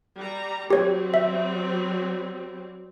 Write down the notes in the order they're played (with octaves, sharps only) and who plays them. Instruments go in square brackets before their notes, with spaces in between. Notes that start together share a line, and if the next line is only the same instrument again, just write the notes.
[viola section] G3 A#5
[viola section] F#3 G3 C4 [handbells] G4 C#5
[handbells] E5